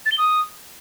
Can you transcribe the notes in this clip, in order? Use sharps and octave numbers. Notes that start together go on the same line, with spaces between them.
A6
G7
D#6